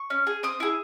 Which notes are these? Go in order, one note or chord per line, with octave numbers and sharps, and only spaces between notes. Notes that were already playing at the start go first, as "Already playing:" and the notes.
Already playing: C#6
C#4
G#4
C4 D#6
E4 G#4